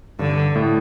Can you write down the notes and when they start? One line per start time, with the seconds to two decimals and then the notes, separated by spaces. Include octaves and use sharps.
0.19 G2 D3
0.56 A2